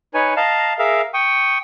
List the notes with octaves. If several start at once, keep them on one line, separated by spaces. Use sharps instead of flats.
D#4 B4 C#5 G#5
D#5 F5 A5 A#5
G#4 A#4 E5 F5 A#5
G5 C#6 D#6